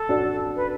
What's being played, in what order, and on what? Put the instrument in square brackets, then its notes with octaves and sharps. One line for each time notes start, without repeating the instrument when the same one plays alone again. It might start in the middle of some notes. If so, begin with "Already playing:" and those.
Already playing: [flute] A4
[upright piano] D4 F#4
[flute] B4